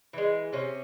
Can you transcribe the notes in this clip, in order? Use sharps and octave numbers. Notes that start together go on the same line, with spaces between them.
E3 G#3
C3 C#4